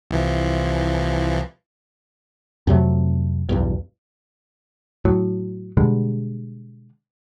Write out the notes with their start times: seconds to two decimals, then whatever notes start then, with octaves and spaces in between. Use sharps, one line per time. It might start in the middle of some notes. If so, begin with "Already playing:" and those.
0.11 C2 E3 F3
2.67 F2 C3 F#3 A3
3.49 B1 E2 G2
5.05 A2 F#3
5.77 B2 D3 G3 G#3